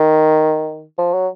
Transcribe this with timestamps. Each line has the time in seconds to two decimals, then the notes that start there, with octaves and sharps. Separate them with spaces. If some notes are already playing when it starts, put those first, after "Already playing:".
Already playing: D#3
0.98 F3
1.14 F#3